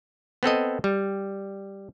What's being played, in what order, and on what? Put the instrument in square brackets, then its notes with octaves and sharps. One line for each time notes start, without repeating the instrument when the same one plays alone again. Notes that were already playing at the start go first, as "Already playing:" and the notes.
[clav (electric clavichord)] B3 C4 A4 D#5
G3